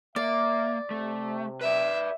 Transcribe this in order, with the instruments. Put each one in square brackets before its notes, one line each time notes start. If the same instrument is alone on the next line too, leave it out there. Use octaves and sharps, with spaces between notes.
[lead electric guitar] A#3 [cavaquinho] D5 [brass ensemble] E5
[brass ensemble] C3 [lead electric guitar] A3
[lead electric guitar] B4 D5 [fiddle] E5